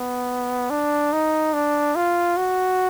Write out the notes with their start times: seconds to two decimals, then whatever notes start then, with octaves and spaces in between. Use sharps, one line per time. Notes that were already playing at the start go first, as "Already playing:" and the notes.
Already playing: B3
0.70 D4
1.13 D#4
1.53 D4
1.96 F4
2.37 F#4